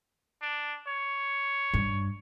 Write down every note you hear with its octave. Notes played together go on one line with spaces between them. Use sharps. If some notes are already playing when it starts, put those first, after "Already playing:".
D4
C#5
G2